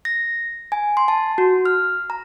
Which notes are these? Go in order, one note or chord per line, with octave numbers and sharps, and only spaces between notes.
A#6
G#5
C6
A5
F#4
F6
A#5